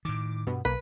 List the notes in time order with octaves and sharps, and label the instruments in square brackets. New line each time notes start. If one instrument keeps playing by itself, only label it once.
[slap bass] A2 D#3 [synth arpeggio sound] D6
[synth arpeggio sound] G2 B2 B3
[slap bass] B1 [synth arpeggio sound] A#3 [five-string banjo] B4